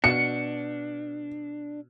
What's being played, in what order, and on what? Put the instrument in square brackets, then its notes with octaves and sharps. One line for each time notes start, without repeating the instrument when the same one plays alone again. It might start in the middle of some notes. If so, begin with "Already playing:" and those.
[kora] B2 [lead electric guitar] D4 [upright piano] C#7